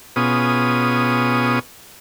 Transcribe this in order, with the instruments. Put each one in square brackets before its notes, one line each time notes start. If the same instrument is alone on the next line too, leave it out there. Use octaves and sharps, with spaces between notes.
[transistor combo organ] B2 B3 C#4 F4 G#4 D#6